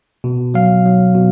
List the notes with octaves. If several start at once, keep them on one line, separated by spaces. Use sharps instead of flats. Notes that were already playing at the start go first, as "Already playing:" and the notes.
B2
F#3 F5
F#3
B2